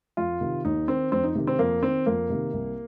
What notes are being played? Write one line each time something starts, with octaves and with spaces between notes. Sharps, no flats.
F2 F4
C3 D#3
D#2 D#4
D#3 C4
F2 C4
D#4
C3 D#3
C4
F2 A#3
D#3 C4
F2 A#3
C3 D#3
C2